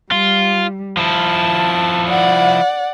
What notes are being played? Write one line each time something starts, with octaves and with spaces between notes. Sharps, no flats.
G3 F4
F3 E4 A5
D5 F#5